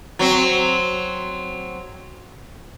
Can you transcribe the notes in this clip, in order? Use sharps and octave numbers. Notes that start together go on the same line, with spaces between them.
F#3 C4